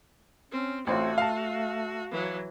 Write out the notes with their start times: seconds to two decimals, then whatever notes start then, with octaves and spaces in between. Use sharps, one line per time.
0.52 C4 C#4
0.87 A1 A3 C4 F4 F#4
1.18 F5 A5
2.11 E3 F#3